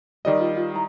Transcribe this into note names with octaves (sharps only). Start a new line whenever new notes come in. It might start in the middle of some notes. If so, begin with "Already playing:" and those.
D#3 G3 G4 D5 D#5
F4
D#4 F4
E4 A#5